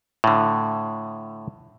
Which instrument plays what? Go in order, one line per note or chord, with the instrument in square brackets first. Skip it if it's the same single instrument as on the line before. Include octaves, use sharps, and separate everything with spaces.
[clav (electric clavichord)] A2 D3